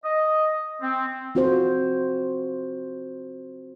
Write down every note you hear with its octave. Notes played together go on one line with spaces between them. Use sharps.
D#5
C4
C4 F4 F#4 A4 C5